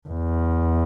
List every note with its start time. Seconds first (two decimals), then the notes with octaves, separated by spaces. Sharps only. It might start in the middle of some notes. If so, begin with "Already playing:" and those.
0.09 E2